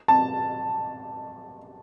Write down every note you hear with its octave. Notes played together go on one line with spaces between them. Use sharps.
A5